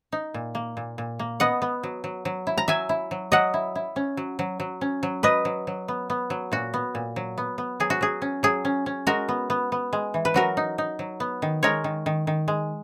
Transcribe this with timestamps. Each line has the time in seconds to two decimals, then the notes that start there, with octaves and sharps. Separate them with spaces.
0.12 D#4
0.34 A#2
0.55 A#3
0.77 A#2
0.98 A#2
1.19 A#3
1.40 B3 D#5 F#5
1.62 B3
1.83 F#3
2.04 F#3
2.25 F#3
2.47 E4
2.58 A#5
2.68 F#3 E5 G#5
2.89 E4
3.11 F#3
3.32 F#3 D#5 F#5
3.54 E4
3.75 E4
3.96 C#4
4.17 F#3
4.39 F#3
4.60 F#3
4.81 C#4
5.03 F#3
5.23 F#3 B4 D#5
5.45 F#3
5.67 F#3
5.88 B3
6.10 B3
6.30 F#3
6.52 A#2 F#4
6.74 B3
6.95 A#2
7.16 F#3
7.38 B3
7.58 B3
7.80 F#3 G#4
7.90 F#4
8.01 F#3 G#4
8.22 C#4
8.43 F#3 G#4
8.65 C#4
8.86 C#4
9.07 G#3 F#4 A#4
9.29 B3
9.50 B3
9.72 B3
9.93 G#3
10.14 E3
10.25 B4
10.34 F#3 F#4 A#4
10.57 D#4
10.78 D#4
10.99 F#3
11.20 B3
11.42 D#3
11.63 G#3 A#4 C#5
11.84 D#3
12.06 D#3
12.27 D#3
12.48 G#3